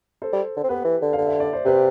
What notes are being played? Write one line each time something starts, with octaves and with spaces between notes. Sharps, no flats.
A4 C5
G3
D3
C4
B3 G4 B4
E3
D3
D3 F5
E5
D5
C5
C3 G4 B4